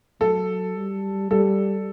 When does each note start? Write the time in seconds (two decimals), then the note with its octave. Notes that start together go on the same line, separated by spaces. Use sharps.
0.21 F#3 A4
0.76 G3
1.31 G3 A4